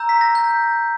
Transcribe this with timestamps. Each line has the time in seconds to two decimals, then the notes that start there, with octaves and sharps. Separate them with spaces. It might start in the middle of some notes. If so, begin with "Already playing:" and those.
Already playing: A#5 E6 G6
0.09 B6
0.21 A#6
0.35 G6